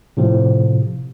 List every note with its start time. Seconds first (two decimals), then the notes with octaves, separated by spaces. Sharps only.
0.17 A2 C3 F3